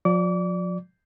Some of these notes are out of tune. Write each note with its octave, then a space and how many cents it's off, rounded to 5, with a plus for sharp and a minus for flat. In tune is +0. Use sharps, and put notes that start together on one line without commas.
F3 +40 D5 +0 D6 -35